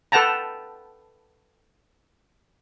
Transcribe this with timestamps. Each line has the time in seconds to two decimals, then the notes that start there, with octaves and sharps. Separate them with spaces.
0.12 A4 B4 F#5 G5 A5 A#5